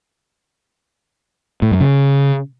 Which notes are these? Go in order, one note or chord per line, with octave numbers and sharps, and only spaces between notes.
A2
F#2
C#3